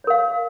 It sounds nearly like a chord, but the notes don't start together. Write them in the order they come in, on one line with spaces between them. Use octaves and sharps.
C#5 A#4 F5